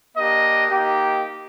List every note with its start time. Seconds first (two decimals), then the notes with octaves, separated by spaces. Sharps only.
0.17 A#3 D4 G4 D#5
0.71 A#3 D#4 G4